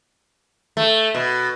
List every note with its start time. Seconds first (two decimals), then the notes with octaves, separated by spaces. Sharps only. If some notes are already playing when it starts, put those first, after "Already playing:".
0.77 A3
1.15 B2